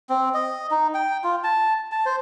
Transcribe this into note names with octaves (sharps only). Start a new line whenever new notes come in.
C4
D#5
D#4
G5
F4
A5
A5
C5